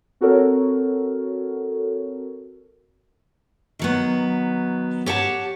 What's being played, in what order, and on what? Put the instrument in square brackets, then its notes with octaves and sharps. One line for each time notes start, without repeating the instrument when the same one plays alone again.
[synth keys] C4 F#4 A4 A#4 C#5
[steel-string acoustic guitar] D#3 F#3 B3
G4 C#5 F#5 A5